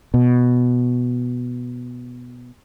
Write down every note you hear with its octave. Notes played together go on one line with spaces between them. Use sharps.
B2